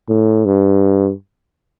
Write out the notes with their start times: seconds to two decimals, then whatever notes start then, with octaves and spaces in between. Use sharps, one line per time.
0.09 A2
0.46 G2